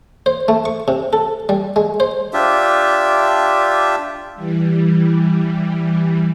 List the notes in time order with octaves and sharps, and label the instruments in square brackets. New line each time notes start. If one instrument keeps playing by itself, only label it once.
[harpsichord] C5
A3
C#6
C3
A4
G3
G#3
C5
[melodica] D4 F4 G4 E5
[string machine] E3 G3